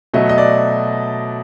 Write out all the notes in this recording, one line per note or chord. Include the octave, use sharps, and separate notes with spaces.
B2 F#3 A3 D#5
D#5
D5